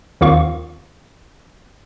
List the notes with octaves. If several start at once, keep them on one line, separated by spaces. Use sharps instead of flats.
D#2 D#3 C4 F4 F5 C#6